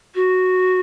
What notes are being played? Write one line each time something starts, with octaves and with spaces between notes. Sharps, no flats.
F#4